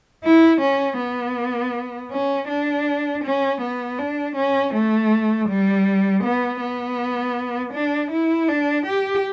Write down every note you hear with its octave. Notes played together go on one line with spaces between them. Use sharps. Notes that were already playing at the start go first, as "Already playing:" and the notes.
E4
C#4
B3
C#4
D4
C#4
B3
D4
C#4
A3
G3
B3
B3
D4
E4
D4
G4